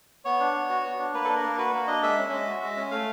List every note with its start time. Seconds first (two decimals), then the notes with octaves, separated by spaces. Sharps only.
0.25 B3 C#5
0.40 D4
0.55 B3
0.70 F#4
0.84 B3
0.99 D4
1.14 A#3 B4
1.24 D4 A4
1.36 A#4
1.44 A#3
1.58 F#4 B4
1.73 A#3
1.87 D4 D#5
2.02 G#3 E5
2.18 C#4
2.32 G#3
2.47 F#4
2.62 G#3
2.77 C#4
2.91 A3 F5